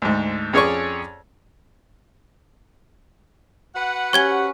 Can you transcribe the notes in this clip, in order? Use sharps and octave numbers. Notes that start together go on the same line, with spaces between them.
D2 G#2
F2 C#4 G#4 C#5 D5 C#6
F#4 B4 F#5
C#4 G4 C#6 G#6 G7